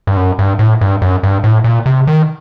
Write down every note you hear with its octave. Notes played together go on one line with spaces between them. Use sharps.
G2
F#2
G2
A2
G2
F#2
G2
A2
A#2
C3
D#3